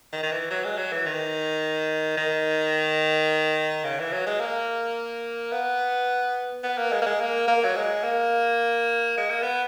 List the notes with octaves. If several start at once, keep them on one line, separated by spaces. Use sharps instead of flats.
D#3
D#3
E3
F#3
G#3
F#3
E3
D#3
D#3
C#3
E3
F#3
G#3
A#3
B3
B3
A#3
G#3
A#3
G#3
A#3
A#3
F#3
G#3
A#3
G#3
A#3
B3